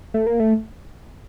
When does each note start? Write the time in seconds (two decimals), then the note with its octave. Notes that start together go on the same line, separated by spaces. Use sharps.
0.14 A3
0.27 A#3
0.40 A3